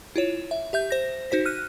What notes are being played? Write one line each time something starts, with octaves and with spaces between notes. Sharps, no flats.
E4 F4 C#5 E7
E5
G4 E5 G6
C5 A#6
D#4 F#4 C5 B6
F6 F#6 D#7